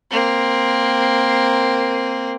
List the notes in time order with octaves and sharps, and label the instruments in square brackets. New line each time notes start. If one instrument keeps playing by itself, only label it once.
[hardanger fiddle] A#3 C4